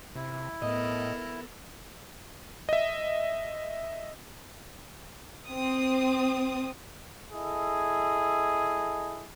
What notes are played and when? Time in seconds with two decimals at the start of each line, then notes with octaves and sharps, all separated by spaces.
0.16 C3 E4
0.62 A2 B3 A4 A#4 D#5
2.69 D#5 E5
5.48 C4 D#6
7.32 E4 G#4 A4 D#5